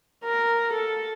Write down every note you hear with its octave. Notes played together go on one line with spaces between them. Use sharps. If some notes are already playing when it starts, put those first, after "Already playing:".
A#4
A4